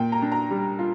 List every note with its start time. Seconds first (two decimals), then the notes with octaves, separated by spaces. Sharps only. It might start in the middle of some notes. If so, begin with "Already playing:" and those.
Already playing: A#2 G5
0.12 A#5
0.22 D4
0.32 A#5
0.51 G3
0.79 F4